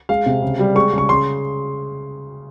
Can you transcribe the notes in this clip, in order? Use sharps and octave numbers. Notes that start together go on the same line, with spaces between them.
G#3 F5
C3
C#3
G3
G#3 C#6
C#3 C#6
C#3 C6